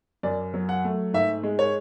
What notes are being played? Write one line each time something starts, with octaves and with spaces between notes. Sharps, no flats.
F#2 D5
F#3
F#5
A3
G#2 E5
G#3
C#5